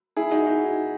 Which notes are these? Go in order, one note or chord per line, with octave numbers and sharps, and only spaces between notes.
E4 G#4
D#4 F#4
D#4 F#4